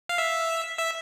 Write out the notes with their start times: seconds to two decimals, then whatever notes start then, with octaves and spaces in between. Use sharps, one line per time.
0.09 F5
0.18 E5
0.79 E5